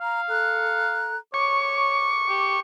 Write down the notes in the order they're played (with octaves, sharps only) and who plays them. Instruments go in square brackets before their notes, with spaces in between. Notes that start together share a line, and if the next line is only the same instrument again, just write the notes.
[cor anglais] F5 [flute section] A#5
[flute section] A4 A#5 F#6
[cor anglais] C#5 [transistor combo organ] C#6 [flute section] D6
[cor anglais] G4